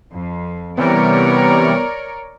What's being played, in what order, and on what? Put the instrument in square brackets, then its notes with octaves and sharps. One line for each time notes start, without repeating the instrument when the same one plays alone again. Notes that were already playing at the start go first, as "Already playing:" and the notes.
[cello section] F2
[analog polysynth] C3 E3 G3 [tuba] B3 [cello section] A#4 C#5 D5